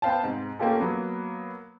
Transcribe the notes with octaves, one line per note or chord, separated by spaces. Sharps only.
B3 C5 F5 G5 A5
G#2 C3
A3 A#3 C#4 F4 G4 A4
F#3 A#3 B3